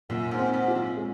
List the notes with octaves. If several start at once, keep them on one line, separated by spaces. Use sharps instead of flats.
F#2 A#2
G#2
C4
G#2
F4
F#2
G#3